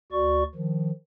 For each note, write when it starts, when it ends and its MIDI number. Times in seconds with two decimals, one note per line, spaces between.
0.12 0.43 38
0.12 0.43 66
0.12 0.43 74
0.12 0.43 85
0.55 0.91 51
0.55 0.91 53